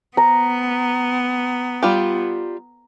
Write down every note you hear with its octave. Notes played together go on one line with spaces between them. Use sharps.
B3 A#5
G3 F4 G4